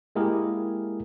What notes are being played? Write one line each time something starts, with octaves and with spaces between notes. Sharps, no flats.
G#3 A#3 E4 G4 G#4 A#4